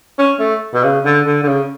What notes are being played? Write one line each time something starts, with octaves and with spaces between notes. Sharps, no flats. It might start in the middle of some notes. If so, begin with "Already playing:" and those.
C#4
A3
B2
C#3
D3
D3
D3
C#3